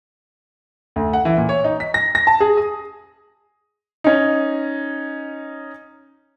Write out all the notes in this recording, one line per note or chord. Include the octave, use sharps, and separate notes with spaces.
D2
F#5
E3
A#2
C#5
D#4
B6
A#6
A#6
A5
G#4
D#6
C#4 D#4